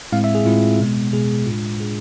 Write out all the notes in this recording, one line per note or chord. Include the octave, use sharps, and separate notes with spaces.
A2 G#3 C4 E4 F5
E5
G#4
A2 G#3 C4 E4 F4
B2 G#3 B3
B2 G#3 B3 G#4
A2 G#3 D4 F4
A2 G#3 D4 G#4